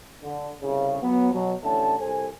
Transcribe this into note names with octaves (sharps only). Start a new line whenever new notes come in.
D3
C2 C#3
F#3 B3
B2 F#3
A1 A2 D3 C#4 A5
C2 A4 C5 G#5